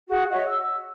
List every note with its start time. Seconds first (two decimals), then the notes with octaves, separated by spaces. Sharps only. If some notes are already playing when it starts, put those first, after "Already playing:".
0.08 F#4 G#4
0.31 F#4 C#5 D#5 E5
0.46 E6